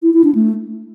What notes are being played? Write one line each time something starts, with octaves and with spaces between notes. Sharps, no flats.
E4
E4
D4
A3